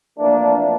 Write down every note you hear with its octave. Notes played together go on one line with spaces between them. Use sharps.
F2 E3 A3 A#3 D4